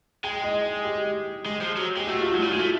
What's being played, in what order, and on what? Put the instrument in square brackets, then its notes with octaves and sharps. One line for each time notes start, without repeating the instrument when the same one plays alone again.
[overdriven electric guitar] G#3 [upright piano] G5
[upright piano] D#5
G4
[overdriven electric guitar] G#3
F3
F#3
[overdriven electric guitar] G#3 [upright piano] G4
[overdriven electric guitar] A3 [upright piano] F#4
[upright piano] F4
F#4
[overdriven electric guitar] F#3
G3
[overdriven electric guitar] G#3 [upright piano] F4
[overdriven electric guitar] A3